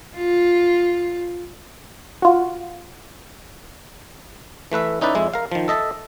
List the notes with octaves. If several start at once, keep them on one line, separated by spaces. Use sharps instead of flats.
F4
F4 F#4
E3 A3 B4 E5
C#4 D#4 E4 B4 D5
F2 G#3 E4
A#4 F5
D#3 F3
A4 D#5 E5 A5